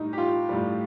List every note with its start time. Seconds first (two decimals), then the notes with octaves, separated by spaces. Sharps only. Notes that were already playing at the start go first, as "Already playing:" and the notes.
Already playing: A2 G3 D#4
0.13 G4
0.18 F4
0.49 A2 G3